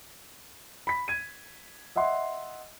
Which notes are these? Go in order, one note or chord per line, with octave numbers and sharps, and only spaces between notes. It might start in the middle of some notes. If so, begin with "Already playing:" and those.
B5 B6
G#6 D#7
D#5 E5 F#5 C6